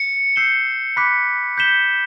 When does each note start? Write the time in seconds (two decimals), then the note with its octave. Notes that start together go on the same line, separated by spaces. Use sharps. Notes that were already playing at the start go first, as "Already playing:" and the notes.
Already playing: C#7
0.36 E6 G6 C7 E7 G7
0.97 B5 D6 F#6 B6
1.58 G6 B6 E7 G7